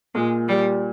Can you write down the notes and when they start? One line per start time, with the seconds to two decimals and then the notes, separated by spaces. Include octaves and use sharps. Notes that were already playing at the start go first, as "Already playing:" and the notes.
0.15 A#2 G#3
0.48 G3